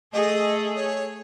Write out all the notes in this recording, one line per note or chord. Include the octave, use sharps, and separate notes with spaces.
A3 G#4 A4 D#5
C#5